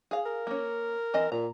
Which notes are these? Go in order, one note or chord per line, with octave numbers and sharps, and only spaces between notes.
G#4 F5
A#4
A#3 C#4
E3 C4 D#5
A#2 A#5